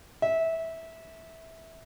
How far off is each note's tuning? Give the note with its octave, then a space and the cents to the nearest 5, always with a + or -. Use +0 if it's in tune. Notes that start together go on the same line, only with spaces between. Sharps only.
E5 -15